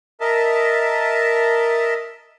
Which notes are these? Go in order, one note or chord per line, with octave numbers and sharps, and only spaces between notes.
A#4 D#5 E5 A5